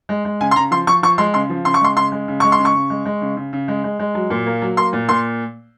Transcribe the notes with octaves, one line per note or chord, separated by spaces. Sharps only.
G#3
G#3
C#3 G#5
C6
C#3 A#5
F3 C6
F3 C#6
F3 C#6
G#3 C6
C#3 C6
F3
C#3 C6
C#6
G#3 C6
C#3 C6
G#3
C#3
G#3 C#6
C6
C#3
C#6
C#3
G#3
G#3
C#3
C#3
C#3
G#3
G#3
G#3
F#3
A#2
A#3
F#3
A#3 C6
A#2
A#2 C6